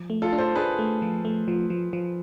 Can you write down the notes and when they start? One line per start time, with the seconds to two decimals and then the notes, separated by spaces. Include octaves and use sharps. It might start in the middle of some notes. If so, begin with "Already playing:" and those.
Already playing: F3
0.10 A3
0.22 F4 A4
0.33 D4
0.38 A4 C5
0.55 D4 G#4 B4
0.79 A3
1.02 F3
1.25 A3
1.48 F3
1.70 F3
1.93 F3